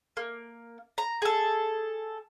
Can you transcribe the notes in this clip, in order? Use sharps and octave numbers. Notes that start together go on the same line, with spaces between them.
A#3
A#5
G#4 A4